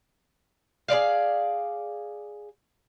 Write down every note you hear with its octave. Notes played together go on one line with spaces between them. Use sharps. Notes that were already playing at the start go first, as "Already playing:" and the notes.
G#4 B4 D5 F5